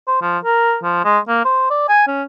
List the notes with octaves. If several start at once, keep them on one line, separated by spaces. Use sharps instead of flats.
C5
F3
A#4
F3
G#3
A#3
C5
D5
G#5
C#4